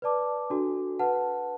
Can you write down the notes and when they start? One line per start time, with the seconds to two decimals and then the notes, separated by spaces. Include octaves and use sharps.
0.02 B4 D5 A5 D6
0.50 D4 F#4 A4
0.99 B4 F#5 A5